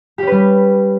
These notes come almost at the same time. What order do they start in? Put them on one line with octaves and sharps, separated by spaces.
G4 C#4 B4 G3